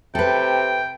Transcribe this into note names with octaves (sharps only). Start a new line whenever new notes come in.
C3 A4 B4 G5